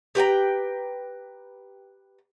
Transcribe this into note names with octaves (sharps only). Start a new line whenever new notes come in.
G4 B4 G5 A#5